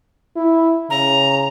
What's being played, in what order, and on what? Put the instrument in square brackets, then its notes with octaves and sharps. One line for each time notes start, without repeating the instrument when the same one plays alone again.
[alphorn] E4
[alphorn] C#3 [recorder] A#5